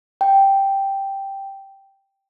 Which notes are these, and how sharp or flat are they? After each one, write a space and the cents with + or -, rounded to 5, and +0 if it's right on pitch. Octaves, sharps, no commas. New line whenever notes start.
G5 +0